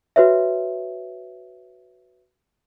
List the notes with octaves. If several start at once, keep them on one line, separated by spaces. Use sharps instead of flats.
F#4 B4 C#5 E5